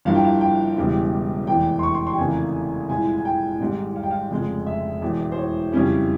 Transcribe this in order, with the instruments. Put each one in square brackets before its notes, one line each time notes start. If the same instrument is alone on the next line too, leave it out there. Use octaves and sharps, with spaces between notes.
[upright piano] G1 G2 F3 A#3 E4 F5
G5
F5
G5
E1 E2 C#3 G3
F1 E2 E3 G5
C6
C#6
C6
C6
G5
F1 F2 C#3 E3 A#3 G#5
C2 A#2 G#3 E4 G#5
G#5
G5
G#1 G#2 G3
F5
G5
F5
F1 F2 C#3 F3 G#3
E5
E1 E2 E3
C5
C#5
F2 C#3 G3 C#4 E4